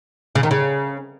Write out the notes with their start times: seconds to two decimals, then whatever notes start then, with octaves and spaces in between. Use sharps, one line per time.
0.35 C#3
0.43 D#3
0.51 C#3